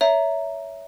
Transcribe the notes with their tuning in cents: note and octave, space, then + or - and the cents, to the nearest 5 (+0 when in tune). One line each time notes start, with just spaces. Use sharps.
C#5 +20 E5 +0 A#5 +0